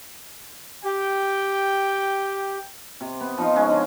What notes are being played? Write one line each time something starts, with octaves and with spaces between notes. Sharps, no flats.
G4 G5
C3
B3
F3 D#4 F4
C#3 G#3 C#4
D3